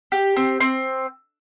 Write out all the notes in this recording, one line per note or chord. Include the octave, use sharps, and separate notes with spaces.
G4
C4
C4